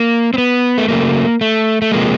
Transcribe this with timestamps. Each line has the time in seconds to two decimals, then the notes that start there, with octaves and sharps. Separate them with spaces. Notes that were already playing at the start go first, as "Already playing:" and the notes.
Already playing: A#3
0.34 C4
0.38 B3
0.78 A3
0.88 C#3 F#3 A3 A#3
1.41 A3
1.82 A3
1.92 C3 F3 G#3 A#3